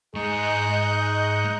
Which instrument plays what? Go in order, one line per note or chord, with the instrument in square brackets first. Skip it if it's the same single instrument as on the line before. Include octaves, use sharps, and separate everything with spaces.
[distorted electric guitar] G#2 G#3 [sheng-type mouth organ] D#4 C#6 [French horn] G#4 [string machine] D#5 F#6 G6